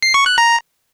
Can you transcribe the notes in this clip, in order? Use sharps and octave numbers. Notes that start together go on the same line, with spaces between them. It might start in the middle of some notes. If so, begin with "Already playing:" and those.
C7
C#6
F#6
A#5